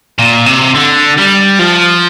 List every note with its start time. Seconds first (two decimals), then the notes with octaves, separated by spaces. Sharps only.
0.19 A#2
0.46 C3
0.74 D3
1.18 G3
1.59 F3